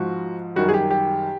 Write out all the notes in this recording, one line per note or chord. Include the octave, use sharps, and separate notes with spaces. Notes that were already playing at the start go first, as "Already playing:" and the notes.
Already playing: G#2 F3 F#4
F#2 D#3 G3 F#4
G#4
G4
G4